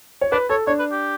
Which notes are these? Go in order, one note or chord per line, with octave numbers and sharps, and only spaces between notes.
C#5
D4 B4
A4 C#5
D4 C#5
B4
G4